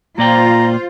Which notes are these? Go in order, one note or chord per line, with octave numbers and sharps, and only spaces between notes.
A#2 F4 C5 D5 G5 A#5